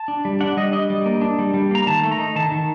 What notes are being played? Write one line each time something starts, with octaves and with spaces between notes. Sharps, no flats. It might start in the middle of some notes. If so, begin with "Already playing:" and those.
Already playing: A5
D4
G3
D4 F#5
G3 D#5
D4 D#5
G3
A#3
D4
G3
G3
A#3 A#5
D#3 A5
A3
A#5
D#4
D#3 A5
D#3